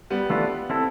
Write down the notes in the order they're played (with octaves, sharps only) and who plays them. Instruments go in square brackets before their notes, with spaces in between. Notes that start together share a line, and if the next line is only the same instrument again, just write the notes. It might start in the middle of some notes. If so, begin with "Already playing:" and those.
[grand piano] G3 B3
[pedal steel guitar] E3 A3 D4 F4 B4
C4 E4 A4